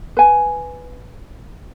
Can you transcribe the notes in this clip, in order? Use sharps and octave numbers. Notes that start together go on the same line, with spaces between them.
B4 G#5